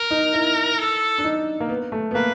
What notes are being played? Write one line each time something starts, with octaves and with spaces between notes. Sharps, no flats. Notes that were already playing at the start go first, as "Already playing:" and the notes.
Already playing: A#4
D#4
E4
A4
D4
D#4
A#3
B3
A3
B3
A#3 B4